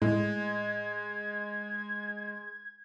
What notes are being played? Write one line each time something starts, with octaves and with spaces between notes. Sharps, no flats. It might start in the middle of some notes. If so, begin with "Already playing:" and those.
A2 G#3 G#6